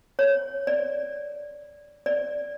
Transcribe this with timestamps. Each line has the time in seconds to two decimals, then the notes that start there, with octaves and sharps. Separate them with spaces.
0.19 C#5
0.67 D5
2.06 D5